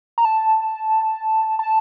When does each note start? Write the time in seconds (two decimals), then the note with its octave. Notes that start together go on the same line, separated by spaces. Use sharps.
0.18 A#5
0.25 A5
1.59 A5